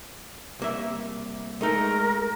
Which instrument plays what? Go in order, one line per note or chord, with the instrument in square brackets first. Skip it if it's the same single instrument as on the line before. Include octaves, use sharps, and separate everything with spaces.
[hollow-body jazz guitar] C2 A#3 E5
[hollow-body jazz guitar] G#3 A3 D#4 [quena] A#4